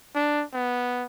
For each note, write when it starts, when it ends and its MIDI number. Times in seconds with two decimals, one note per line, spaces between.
0.15 0.44 62
0.53 1.05 59